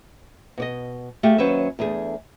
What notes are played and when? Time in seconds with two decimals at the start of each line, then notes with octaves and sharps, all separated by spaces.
0.58 B2 D5 D#5
1.23 A3 F4 G4 G#4
1.38 D#2 F#3 C#4 B4 C5 E5
1.79 E2 A3 D4 G#4